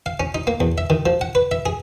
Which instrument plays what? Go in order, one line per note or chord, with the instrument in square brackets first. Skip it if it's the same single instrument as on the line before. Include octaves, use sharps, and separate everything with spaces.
[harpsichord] F5
C#4
D#4
A#3
E2
E5
D#3
F3
F#5
B4
E5
G#4